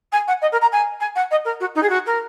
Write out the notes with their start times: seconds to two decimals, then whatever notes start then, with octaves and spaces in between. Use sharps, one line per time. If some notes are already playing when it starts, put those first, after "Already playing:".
0.12 G#5
0.28 F#5
0.41 D#5
0.52 A#4
0.61 A#5
0.72 G#5
1.00 G#5
1.16 F#5
1.31 D#5
1.45 A#4
1.60 F#4
1.75 D#4
1.82 G#4
1.89 F#4
2.06 A#4